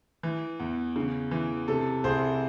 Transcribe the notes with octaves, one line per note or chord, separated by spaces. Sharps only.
E3
E2
C#3
E3
C3 A4
C2 G#4 C5